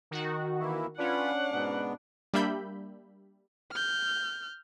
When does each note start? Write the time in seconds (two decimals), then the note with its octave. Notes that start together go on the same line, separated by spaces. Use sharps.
0.11 D#3 F#4
0.60 E3 A#3 E4
0.99 C#4 D4 F4 B4 F#5
1.52 G#2 B2 B3
2.34 G3 A#3 D4 E5 B5 G6
3.71 F6 G6